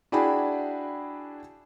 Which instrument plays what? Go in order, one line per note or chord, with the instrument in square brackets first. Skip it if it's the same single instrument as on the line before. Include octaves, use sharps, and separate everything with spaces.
[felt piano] D4 E4 F#4 G#4 G5 B5